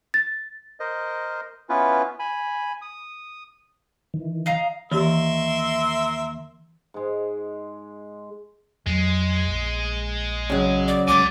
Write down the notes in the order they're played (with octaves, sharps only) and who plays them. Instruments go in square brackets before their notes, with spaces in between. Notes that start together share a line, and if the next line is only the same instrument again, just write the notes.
[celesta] A6
[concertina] A#4 C5 D#5
B3 C#4 E4 F4 B4
G#5 B5
D#6
[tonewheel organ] D#3 E3
[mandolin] D#5 F5 A#5
[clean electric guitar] D#2 [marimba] E3 G4 [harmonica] A#4 E5 C6
[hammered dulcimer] G#2 G#3
[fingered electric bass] F2 F#3 [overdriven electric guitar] G#3
[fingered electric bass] A#1
[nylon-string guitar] C#3 F#3
[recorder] D5
[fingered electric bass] C2 G#3 [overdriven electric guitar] D5 G#5 [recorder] D6